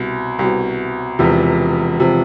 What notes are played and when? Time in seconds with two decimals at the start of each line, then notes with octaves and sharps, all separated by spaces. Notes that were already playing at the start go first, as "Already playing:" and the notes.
Already playing: C2 B2
0.39 C2 B2
1.19 E1 E2 C3 F3
2.00 C3 F3